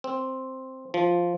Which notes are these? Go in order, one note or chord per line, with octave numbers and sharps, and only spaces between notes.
C4
F3